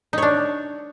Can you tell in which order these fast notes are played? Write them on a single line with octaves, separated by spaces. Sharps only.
D#4 C#5 D4